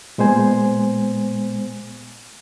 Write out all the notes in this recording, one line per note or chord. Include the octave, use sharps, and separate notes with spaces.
A#2 G#3 B3 C5 G#5